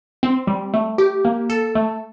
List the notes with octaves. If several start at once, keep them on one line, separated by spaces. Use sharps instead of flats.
C4
G3
A3
G4
A#3
A4
A3